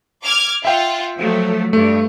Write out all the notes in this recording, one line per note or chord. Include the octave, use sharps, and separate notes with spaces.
D6 F6 G#6
F4 E5 F#5 G5
F3 F#3 A3
G2 A3